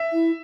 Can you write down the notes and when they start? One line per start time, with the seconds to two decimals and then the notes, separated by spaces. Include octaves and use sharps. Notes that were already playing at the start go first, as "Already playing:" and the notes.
Already playing: E5
0.13 E4